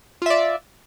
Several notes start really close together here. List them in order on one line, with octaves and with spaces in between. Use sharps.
F4 E5 D5